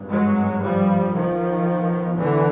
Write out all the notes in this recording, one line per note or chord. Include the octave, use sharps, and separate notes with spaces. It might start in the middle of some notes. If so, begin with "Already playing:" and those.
Already playing: G#1 G2
F#3 G#3
F3 G3
B1 B2 D#3 F3
D3 E3